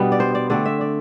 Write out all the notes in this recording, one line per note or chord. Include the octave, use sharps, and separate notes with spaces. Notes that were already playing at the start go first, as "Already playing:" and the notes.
Already playing: B2 G3 B3 D4
D5
C5
D5
D3 A3 C4 D5
E5
D5